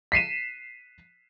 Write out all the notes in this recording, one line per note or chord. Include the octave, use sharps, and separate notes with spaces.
B6 C7 D#7 E7